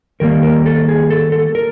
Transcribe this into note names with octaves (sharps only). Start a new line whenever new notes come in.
D#3 G3 A#3 A#4
A#4
A4
G#4
A4
A4
A#4